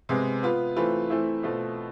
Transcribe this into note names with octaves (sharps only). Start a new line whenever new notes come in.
C3 G#3 B3
B3 F4 B4
E3 A3 C4 F4 B4
E3 A3 C4 E4
B2 A3 C4 F4